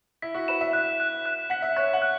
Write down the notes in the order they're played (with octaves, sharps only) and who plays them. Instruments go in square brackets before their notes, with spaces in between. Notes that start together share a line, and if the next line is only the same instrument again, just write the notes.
[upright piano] E4 [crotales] B6
[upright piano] F#4
[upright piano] B4 [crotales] E7
[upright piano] E5
[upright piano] E5 [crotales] F#6
[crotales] F#6
F#6
[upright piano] F#5 [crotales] B6
[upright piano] E5
[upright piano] C#5 [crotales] F#6
[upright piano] F#5
[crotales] F#6